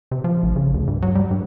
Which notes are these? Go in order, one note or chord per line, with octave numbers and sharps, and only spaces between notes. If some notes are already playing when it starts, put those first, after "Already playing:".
C3
F3
A1
C#3
D2
G2
F#3
G3
G2